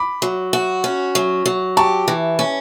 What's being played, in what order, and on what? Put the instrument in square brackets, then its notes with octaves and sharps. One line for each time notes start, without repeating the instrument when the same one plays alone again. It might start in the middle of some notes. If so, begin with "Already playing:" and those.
Already playing: [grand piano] B5 D6
[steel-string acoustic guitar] F#3
F#4
C#4
F#3
F#3
[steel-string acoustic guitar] G4 [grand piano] A5 C#6
[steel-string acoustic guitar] E3
C#4